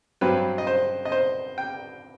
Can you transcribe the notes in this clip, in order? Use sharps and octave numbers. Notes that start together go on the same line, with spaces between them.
G2 F#3 C4 B4
D#5
C5
D#5
C5
G5